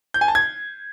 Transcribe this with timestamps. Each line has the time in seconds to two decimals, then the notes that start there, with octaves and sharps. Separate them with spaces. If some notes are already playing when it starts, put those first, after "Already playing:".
0.14 G6
0.21 G#5
0.28 A5
0.35 G#6